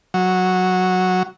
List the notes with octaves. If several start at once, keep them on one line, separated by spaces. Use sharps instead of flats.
F#3